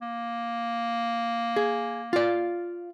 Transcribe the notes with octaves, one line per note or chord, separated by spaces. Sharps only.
A#3
G#4
F4 D5